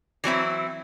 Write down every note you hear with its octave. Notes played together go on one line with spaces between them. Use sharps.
E3 F#3 C4 E4